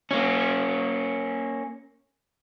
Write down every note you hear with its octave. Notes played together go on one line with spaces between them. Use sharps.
A#3 C#4